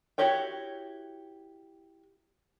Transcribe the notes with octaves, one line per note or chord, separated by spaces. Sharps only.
E4 F#4 G4 C#5 G5